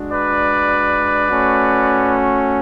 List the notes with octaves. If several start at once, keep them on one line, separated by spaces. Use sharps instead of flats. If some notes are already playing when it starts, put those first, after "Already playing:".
Already playing: G#3 D4 F#4
B4 D5
A3 C#4 F#4